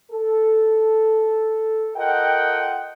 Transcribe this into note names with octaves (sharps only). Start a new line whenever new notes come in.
A4
F4 A4 A#4 D#5 F#5 G5